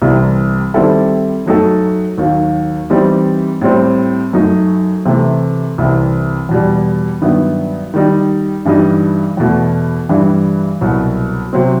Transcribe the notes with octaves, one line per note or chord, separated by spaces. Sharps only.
C2 C3 E3 G3
D#3 G3 C4 E4 A4
F#2 F#3 A3 D#4 A4
D#2 D#3 F#3
E3 G3 C4 D#4
A2 G3 C4
F#2 F#3 A3 D#4
C3 E3 A3
C2 C3 E3
E2 B2 G3
G2 D#3 F#3 B3 E4
D#3 G3 D#4
G2 E3 G3 D#4
E2 B2 A3
G2 E3 G3
C2 B2 F#3
C3 F#3 C4